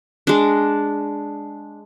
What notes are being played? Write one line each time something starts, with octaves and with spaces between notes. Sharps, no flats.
G#3 D4